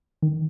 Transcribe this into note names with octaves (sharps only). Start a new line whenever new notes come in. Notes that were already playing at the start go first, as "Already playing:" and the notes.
D#3